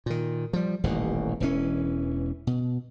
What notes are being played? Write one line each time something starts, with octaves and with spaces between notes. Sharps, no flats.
A#2 D#3
F3 G3
D#1 A1 D#2 B2
E1 E3 C#4
B2